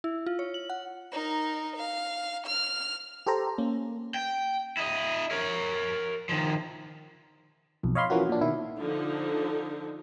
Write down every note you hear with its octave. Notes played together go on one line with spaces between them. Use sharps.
E4
F4
C#5
F#7
F#5
D#4 A#4
F5
F6
G4 A4 C5 A#5
A#3 C#4
G5
E4 D#5
A#4 C#5
D#3 F3
B1 F2
C#5 D#5 F5 B5 C6
E3 F3 A#3 C#4 F#4
A#2 D4
B2 D#3 E4
D3 F3 D#4